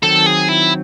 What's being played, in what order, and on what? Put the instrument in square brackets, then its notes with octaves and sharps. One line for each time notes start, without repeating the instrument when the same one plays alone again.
[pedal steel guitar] D#3 F#3 C4 [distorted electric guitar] A4
[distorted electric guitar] G#4
E4